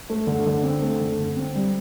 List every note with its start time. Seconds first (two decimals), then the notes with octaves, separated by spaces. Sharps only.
0.10 A3
0.27 D3
0.46 D3
0.63 C4
0.82 A3
1.00 D3
1.19 D3
1.37 C4
1.56 G3